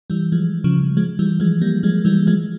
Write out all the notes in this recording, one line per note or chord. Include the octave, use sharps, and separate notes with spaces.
E3 G3
F3 G#3
C#3 F3
F3 G#3
E3 G3
F3 G#3
G3 A#3
F3 G#3
E3 G3
F3 G#3